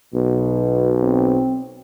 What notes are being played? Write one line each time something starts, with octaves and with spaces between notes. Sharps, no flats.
B1 B2
C4